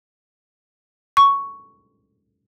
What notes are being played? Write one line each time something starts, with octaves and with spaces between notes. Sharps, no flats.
C#6